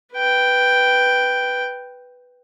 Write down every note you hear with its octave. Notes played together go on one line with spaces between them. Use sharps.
B4 G5